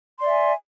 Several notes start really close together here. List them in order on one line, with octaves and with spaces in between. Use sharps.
C6 D5 E5 G#5